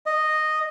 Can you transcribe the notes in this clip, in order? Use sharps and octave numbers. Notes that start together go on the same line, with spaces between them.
D#5